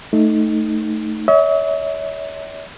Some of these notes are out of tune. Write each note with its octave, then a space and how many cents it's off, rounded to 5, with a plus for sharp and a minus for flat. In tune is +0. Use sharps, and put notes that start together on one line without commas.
A3 +0 D#4 +0
C#5 +35 E5 -45